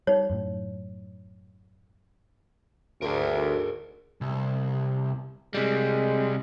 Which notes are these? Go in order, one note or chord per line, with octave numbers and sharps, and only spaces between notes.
G3 D#4 C#5
F#2 A2
D2 G#4 A#4
C2
C3 G3 G#3